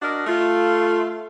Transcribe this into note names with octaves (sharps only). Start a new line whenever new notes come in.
D4 F#4 A#4 D#5
A3 F4